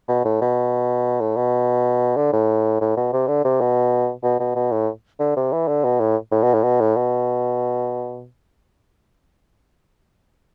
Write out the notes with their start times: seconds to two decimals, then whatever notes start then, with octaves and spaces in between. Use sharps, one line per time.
0.08 B2
0.25 A2
0.41 B2
1.21 A2
1.37 B2
2.16 D3
2.33 A2
2.81 A2
2.97 B2
3.13 C3
3.28 D3
3.44 C3
3.61 B2
4.24 B2
4.40 B2
4.56 B2
4.72 A2
5.20 D3
5.37 C3
5.53 E3
5.68 D3
5.84 B2
6.00 A2
6.32 A2
6.43 B2
6.54 A2
6.63 B2
6.80 A2
6.96 B2